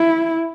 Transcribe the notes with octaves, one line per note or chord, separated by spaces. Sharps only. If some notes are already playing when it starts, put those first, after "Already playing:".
Already playing: E4